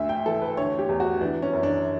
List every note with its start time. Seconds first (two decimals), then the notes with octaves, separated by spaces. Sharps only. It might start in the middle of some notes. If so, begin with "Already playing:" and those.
Already playing: D2 E5
0.09 G5
0.26 E3 A4
0.42 B4
0.57 D3 C#5
0.79 G4
0.89 E2
1.00 F#4
1.21 E3 D4
1.42 C#4
1.53 F#2
1.63 D4